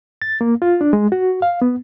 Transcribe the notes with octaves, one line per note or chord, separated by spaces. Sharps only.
A6
A#3
F4
D4
G#3
F#4
F5
B3